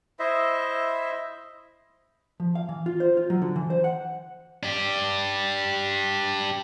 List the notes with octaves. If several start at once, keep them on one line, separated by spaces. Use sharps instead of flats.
E4 C5 D#5 E5
F3
F5
E3
F4
C5
F4
F#3
D3
E3
C5
F#5
D4 G4